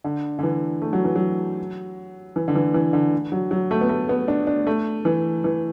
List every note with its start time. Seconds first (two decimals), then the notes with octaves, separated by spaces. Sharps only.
0.04 D3
0.39 D3
0.43 E3
0.82 A3
0.93 F#3
1.04 E3
1.16 F#3
2.36 E3
2.48 D3
2.55 E3
2.74 E3
2.93 D3
3.32 F#3
3.51 F#3
3.71 A3
3.81 B3
3.89 A3
4.09 B3
4.28 D4
4.47 D4
4.67 A3
5.05 E3
5.44 E3